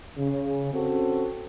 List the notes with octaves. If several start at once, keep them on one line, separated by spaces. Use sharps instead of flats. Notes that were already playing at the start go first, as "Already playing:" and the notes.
C#3
C4 C#4 F#4 A4